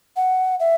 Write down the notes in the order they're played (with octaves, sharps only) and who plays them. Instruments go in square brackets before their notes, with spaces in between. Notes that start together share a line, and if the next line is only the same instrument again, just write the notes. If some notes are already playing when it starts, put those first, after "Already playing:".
[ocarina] F#5
E5